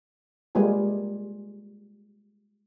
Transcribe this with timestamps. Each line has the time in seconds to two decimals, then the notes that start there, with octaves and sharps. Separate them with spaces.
0.55 G3 G#3 A#3 F4 G#5